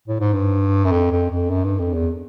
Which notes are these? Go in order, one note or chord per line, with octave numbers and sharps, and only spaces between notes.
A2
G#2
G2
F#2
F2
F2
F2
F#2
G2
F2
E2